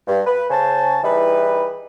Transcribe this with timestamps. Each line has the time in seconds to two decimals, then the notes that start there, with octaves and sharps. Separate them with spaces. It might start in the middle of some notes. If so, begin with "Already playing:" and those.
0.08 G2
0.26 B4
0.50 C#3 C5 G#5 A5
1.03 E3 G3 D#4 E4 G#4 B4